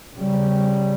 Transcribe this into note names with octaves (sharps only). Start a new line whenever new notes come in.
C#3 G3